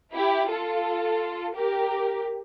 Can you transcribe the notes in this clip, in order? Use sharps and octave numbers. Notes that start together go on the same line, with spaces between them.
E4 G4
F4 A4
G4 A#4